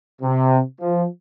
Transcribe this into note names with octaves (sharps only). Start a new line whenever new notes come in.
C3
F3